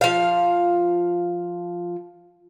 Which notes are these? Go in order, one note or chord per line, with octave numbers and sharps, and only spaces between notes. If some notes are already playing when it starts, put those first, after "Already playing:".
F3 F5